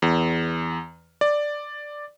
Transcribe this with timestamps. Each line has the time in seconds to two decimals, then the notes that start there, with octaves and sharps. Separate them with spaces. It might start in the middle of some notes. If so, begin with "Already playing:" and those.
0.02 E2
1.21 D5